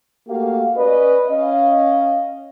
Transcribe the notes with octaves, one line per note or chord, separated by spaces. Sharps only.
A3 A#3 F#4 G4 F5
C#4 B4 D5 D#5
C#4 D#5 F5